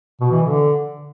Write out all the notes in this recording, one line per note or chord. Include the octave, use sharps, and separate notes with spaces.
B2
E3
D3